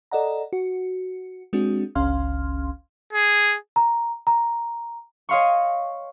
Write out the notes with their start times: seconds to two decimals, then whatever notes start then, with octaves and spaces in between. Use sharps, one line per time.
0.11 A4 D5 D#5 F#5 A#5
0.53 F#4
1.53 G#3 C4 D4 F#4 G#4
1.95 G1 C#2 C#4 F5 C6 F6
3.13 G#4
3.76 A#5
4.27 A#5
5.29 C#5 D#5 F5 C6 C#6